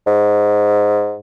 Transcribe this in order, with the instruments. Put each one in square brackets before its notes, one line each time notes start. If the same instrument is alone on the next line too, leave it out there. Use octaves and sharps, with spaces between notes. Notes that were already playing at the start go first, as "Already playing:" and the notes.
[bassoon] G#2